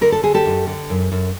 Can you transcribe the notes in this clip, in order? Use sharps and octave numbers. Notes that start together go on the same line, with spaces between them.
D3 A#4
A4
D3 G#4
G4 A4
F#2
D3
F#2
F#2